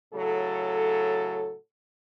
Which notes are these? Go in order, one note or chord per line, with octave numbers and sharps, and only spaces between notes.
A2 C#3 F#3 A4